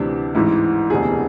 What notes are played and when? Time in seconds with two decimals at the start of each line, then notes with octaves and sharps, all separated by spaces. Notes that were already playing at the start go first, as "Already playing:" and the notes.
Already playing: D2 C3 E3 D4
0.35 A1 G#2 E3 E4
0.90 E1 D2 C3 E3 G#4